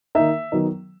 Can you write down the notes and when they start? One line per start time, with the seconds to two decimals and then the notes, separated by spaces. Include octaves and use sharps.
0.15 D#3 A#3 D#4 E5
0.52 D#3 F#3 B3 D#4